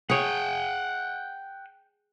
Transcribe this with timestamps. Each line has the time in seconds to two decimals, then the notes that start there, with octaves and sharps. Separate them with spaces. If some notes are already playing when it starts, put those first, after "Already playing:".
0.10 G#4 C#5 F#5 G5